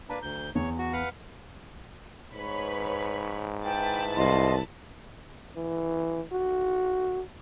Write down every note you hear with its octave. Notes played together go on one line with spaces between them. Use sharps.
A#3 D4 B4 A#5
D2 G6
E2 C#5
F#4
B4 F5 F#5
G#2 B4 C#5 B5
E4 B4 G5 A5
C2 D#5 F5 C6
E3
F#4